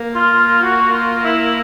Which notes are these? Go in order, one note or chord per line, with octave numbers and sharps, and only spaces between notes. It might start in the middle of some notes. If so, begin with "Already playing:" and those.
Already playing: A#3
F4
F#4
F4
E4